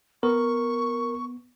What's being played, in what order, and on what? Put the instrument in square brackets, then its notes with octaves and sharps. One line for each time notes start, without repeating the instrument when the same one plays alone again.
[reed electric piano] B3 [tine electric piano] A#4 [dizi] C#6